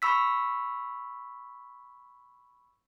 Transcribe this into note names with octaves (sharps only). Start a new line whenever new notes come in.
B5 C#6 E6 B6